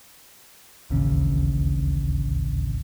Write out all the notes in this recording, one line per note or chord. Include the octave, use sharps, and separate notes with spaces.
D1 A1 D#2 C#3